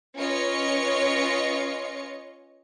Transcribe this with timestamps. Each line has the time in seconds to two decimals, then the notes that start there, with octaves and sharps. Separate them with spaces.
0.16 C#4 F4 B4 C#5 D#5 C#7